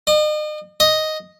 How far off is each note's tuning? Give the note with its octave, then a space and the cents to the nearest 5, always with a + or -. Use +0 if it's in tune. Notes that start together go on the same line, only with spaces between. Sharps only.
D#5 -40
D#5 +0